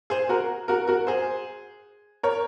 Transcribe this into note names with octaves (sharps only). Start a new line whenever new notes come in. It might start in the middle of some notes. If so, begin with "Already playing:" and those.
G#4 C5
F#4 A#4
F#4 A#4
F#4 A#4
G#4 C5
A#4 C#5